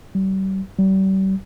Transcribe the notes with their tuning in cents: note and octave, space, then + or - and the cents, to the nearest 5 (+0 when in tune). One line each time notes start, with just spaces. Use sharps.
G3 -40
G3 -40